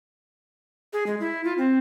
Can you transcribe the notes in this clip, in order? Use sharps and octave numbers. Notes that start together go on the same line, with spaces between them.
G#4
G#3
E4
F4
C4